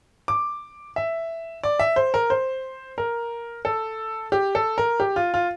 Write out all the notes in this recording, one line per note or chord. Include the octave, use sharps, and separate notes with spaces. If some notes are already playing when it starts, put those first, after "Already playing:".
D6
E5
D5
E5
C5
A#4
C5
A#4
A4
G4
A4
A#4
G4
F4
F4